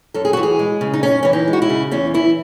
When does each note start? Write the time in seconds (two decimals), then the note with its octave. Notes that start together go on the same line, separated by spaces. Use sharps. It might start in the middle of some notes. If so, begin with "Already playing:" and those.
0.14 F#2 A4
0.25 G#4
0.33 E3 F#4
0.43 G#4
0.59 G#3
0.81 C#3
0.93 D#4
1.03 F#2 C#4
1.23 E3 C#4
1.33 D#4
1.48 G#3
1.53 F#4
1.62 E4
1.70 C#3
1.91 E2 C#4
2.14 E3 E4